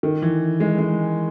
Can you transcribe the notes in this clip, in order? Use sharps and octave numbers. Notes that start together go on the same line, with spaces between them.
D#3
E3
G#3
G#3